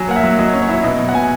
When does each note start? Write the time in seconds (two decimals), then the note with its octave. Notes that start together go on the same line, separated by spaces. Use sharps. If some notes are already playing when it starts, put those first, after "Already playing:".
Already playing: F#3 G#5
0.08 A#3 F#5
0.16 E5
0.24 F#3
0.38 F#3 D#5
0.53 C#4
0.62 C#5
0.69 E4
0.83 B2 D#5
0.99 F#3
1.09 F#5
1.14 B2 G#5